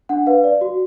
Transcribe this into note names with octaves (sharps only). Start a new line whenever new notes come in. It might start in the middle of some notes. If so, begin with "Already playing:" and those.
D4 F#5
B4 F5
D5
F#4